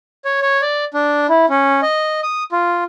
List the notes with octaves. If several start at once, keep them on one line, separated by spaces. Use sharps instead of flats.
C#5
C#5
D5
D4
E4
C#4
D#5
D#6
F4